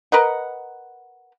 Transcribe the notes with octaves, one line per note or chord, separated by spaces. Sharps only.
A#4 B4 D#5 F#5